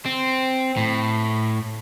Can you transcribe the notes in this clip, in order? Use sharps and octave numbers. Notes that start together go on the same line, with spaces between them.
C4
A2